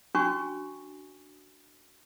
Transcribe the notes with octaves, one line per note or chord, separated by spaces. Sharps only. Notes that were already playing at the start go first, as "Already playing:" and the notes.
C#4 D4 F#4 G5 G#5 C#6